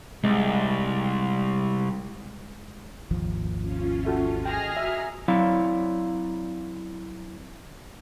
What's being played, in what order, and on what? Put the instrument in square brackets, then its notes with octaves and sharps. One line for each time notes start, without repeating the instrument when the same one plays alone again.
[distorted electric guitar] C2 [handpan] G#3
[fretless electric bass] G#1 D#2 F3
[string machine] C#4 F4
[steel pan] F#4 A4 E5
[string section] G#4 F6 A#6 [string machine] D#5 G#5 [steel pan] G5
[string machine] F#4 A#5 E6 [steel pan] E5
[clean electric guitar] F#3 C4 E4 C#5 D5 F5